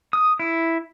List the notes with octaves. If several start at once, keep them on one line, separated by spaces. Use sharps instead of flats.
D#6
E4